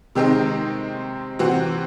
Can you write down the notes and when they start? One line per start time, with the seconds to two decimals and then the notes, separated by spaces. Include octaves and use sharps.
0.15 C3 D#3 G#3 C4 D#4
1.39 C3 E3 C4 F#4